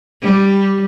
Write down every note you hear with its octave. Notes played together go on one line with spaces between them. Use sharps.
G3